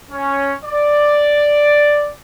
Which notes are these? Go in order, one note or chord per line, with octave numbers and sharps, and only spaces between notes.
C#4
D5